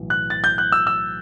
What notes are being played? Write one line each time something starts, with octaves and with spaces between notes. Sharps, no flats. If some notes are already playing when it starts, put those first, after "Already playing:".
Already playing: B1 A2 E3
F#6
A6
G6
F#6
E6
E6